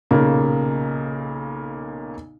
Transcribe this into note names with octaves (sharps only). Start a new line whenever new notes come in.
B1 A#2 C#3 A#3